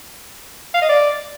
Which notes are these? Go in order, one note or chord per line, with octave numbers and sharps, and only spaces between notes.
F5
D#5
D5